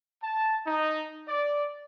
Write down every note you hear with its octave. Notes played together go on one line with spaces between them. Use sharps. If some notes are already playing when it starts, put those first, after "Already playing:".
A5
D#4
D5